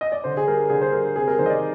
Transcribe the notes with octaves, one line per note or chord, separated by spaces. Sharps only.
D#5
D5
D3 C5
G#4
G3 A#4
D3 G#4
C5
G3 A#4
C3 G#4
A#4
D#3 G3 C5
D#5
D5